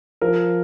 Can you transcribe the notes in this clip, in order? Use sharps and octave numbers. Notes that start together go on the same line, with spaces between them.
F3 A#4